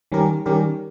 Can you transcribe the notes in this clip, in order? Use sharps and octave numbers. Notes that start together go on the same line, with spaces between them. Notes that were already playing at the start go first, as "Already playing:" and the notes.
D#3 G3 C#4 G4 A#4
D#3 G3 C#4 G4 A#4